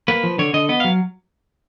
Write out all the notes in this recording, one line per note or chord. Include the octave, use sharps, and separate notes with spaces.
A#3 B4
F3
D3 C#5
D3 D#5
B3 D#5
F#3 F5